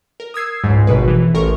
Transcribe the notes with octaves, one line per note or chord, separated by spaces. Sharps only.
A#4
D#6 E6 G#6 C7
C#2 G#2
G#1 B2 B4
E3
A1 A#4 C#6